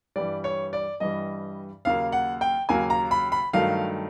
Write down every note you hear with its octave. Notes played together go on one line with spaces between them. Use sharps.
G2 E3 G3 D5
C#5
D5
G2 E3 G3 D#5
D#2 C#3 F#3 A#3 F5
F#5
G5
D#2 C#3 F#3 A#3 G#5
A#5
B5
B5
G2 D#3 F#3 A3 F5